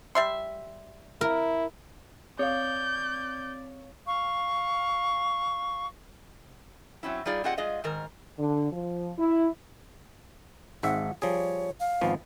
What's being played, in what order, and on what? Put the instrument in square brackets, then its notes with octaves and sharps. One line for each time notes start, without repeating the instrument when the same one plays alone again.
[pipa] G3 E5 C6
[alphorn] E4 [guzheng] A#4
[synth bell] C4 [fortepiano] C#5 F5 [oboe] D5 [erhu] G6
[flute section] F5 C#6
[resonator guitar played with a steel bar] F#3 C4 C#4 E4
G3 D#4 F4 G#4 D5
C4 F4 G4 G#4 D#5 F#5
G#3 F4 G#4 D#5 F5
G#2 D#3 A#4
[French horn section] D3
F3
E4
[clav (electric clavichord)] G#1 G#2 E5 [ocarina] F#5
[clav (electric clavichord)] F3 G3 G#4 [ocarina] C#5
[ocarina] F5
[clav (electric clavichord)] G#1 F3 B3